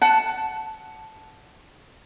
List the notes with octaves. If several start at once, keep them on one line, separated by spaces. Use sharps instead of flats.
F#5 A5